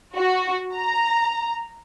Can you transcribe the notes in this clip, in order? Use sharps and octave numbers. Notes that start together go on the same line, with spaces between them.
F#4
A#5